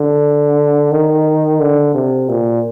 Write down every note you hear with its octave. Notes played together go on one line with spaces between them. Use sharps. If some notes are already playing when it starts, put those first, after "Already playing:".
Already playing: D3
D#3
D3
C3
A#2